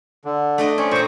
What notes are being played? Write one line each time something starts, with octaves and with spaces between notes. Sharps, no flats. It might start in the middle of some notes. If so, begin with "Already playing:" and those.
D3
A3 D4 D#5
C4 C#4 C#5
A#2 C4 C5 C#6